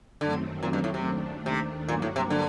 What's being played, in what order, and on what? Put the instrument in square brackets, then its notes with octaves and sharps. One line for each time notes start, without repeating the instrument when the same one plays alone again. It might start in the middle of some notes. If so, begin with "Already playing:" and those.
[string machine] F#2 D#3 F#3 A3 C4 [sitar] D3
[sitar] A#2
G2
A2
C3
[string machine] D#2 D#3 A3 D4
[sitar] C3
[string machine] G2 F#3 A#3 F#4 [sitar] A#2
[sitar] A2
C3
D3